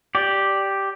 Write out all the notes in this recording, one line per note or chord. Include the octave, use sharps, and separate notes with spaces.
G4 D5